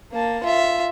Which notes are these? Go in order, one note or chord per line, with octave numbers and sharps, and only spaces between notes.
A#3 A5
F4 E5